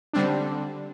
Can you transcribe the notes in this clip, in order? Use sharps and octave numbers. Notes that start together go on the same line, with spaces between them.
D3 G3 C4 D4